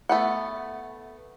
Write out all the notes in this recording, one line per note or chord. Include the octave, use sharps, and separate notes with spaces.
A3 B3 F#5